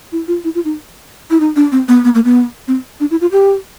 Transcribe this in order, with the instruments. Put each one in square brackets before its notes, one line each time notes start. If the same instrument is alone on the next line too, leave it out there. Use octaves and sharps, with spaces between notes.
[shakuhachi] E4
F4
E4
F4
D#4
E4
D#4
D4
C4
B3
B3
A#3
B3
C4
D4
E4
F4
G4